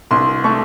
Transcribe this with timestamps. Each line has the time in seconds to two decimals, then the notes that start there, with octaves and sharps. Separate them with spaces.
0.11 C2 C6
0.44 A3 C#6